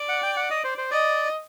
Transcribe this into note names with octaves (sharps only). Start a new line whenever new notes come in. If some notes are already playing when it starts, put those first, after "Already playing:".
Already playing: D5
F#5
G5
F#5
D#5
C5
C5
D5 D#5